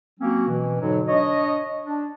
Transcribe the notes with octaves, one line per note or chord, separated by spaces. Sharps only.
F#3 A#3 C4 C#4 F#4
B2 E3
G#2 B2 D3 F#3
D4 C#5 D#5
D4